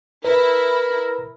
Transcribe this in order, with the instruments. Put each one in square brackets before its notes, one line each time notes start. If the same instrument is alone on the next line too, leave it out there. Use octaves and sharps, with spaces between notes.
[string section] E4 [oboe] A#4 [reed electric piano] B4